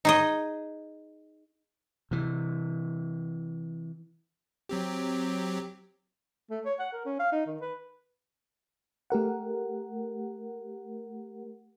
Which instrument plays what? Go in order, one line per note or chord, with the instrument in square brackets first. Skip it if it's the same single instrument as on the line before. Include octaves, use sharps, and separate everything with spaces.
[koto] D#4 G#4 D#5
[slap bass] C3 E3
[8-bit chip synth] F#3 C4 G4
[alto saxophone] A3
C#5
F#5
A#4
C#4
F5
D#4
D#3
B4
[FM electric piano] A3 G4 A#4 F#5